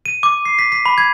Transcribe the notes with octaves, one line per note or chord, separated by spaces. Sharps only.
D#7
D6
C7
B6
B6
B5
G#6